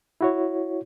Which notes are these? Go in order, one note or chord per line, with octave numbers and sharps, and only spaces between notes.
E4 F#4 C#5